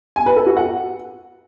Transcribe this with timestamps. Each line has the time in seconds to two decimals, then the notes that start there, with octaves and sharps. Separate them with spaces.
0.16 G#5
0.26 B4
0.36 A4
0.46 F#4
0.57 F#5